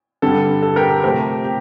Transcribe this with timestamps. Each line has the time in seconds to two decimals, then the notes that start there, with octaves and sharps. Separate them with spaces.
0.22 G2 D3 G3 A4
0.62 A4
0.76 G4 A#4
0.90 A4
1.03 C3 F3 A3 C4 G4 A#4
1.44 G4